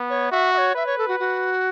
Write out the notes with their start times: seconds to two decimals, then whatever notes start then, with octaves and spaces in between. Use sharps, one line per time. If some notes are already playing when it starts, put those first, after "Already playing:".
Already playing: B3
0.10 C#5
0.31 F#4 E5
0.53 E5
0.58 C#5
0.75 B4 E5
0.87 C#5
0.98 A4
1.08 F#4
1.20 F#4